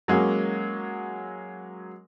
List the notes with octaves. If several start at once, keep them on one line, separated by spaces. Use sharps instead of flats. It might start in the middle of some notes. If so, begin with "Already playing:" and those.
F#3 G#3 A#3 C#4